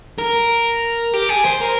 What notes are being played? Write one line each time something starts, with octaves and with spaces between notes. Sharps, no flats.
A#4
G4
G#4
C5
A#4